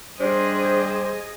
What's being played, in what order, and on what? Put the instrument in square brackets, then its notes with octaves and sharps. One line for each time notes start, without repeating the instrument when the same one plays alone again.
[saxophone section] G3 C5 [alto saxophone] D4 [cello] G#4 D#5